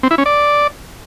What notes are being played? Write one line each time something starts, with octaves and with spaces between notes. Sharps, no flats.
C4
E4
C#4
D5